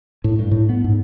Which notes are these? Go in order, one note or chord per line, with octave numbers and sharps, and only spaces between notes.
A2
G2
A2
B3
G#2